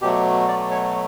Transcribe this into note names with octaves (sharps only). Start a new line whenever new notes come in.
B2 F#3 A3 G4
D5
C#5